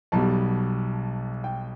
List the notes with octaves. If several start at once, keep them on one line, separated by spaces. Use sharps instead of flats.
B1 B2 G3 A5
G5